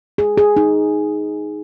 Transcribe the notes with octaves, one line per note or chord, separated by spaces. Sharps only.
G#4
G#4
D#4